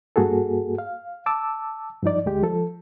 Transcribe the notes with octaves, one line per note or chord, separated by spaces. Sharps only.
G2 A#3 F#4 G#4 A4
F5
A5 D6 E6
G2 F3 D#4 D5
D2 G#3 G4
F3 A4